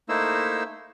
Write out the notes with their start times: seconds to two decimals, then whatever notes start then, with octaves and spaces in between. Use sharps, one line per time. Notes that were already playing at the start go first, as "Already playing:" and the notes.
0.09 A3 A#3 D#4 E4 C5 E6